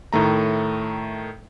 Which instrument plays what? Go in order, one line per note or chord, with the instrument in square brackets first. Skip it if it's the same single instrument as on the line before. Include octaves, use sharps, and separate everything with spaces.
[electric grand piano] A2 D#3 A3 A#5